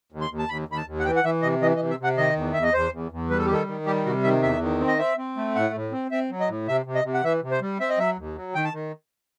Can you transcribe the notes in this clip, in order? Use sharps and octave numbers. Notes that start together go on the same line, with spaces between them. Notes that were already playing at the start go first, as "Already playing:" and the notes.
D#2
C6
D#2
A5
D#2 B5
D#2 B5
A5
D#2
F#5
E3 G5
F#5
E3 E5
C3 D#5
E3 D#5
D#5
C3
E5
C3 F#5
D#3 D#5
E2
E2 E5
D#5
E2 C5
E2
E2
G3 B4
A4
G4
D#3 A4
D#3
G3 G4
C3 F#4
D#3 E5
E2 E5
D#3
C4
D#5
C4 E5
C4
A3
A2 F#5
A2
C4
C4 E5
F#3
D#5
A2
C3 E5
C3
D#5
C3
F#5
E3 E5
C3
C5
G3
C4 E5
D#5
F#3 E5
D#2
F#3
D#3 G5
A5
D#3